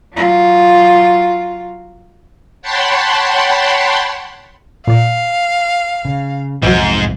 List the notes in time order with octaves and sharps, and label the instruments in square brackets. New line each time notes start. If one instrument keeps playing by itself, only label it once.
[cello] F#3 F4
[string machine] C#5 F#5 G5 A5 B5 C6
[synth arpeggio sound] A#2 D5 [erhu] F5
[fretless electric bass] C#3
[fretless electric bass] B1 F2 C3 [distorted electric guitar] G#2 [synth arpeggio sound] E3 F#3